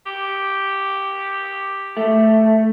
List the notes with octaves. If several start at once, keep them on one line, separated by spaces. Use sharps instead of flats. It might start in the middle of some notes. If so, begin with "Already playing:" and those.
G4
A3